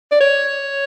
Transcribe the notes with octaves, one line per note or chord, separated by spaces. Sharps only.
D5
C#5